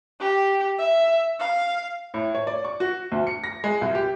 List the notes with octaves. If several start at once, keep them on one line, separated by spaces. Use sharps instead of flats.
G4
E5
F5
A2
C#5
D5
C#6
F#4
D2
C#7
A#6
G#3
C2
G4